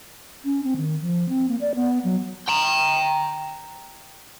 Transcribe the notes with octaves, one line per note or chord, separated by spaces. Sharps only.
C#4
C4
D#3
F3
C4
A#3
D5
B3
F#3
G5 A#5